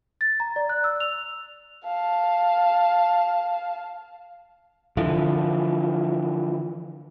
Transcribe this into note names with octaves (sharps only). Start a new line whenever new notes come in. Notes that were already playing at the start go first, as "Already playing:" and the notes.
A6
A#5
D5
F#6
E6
F7
F5 A5
D3 E3 F3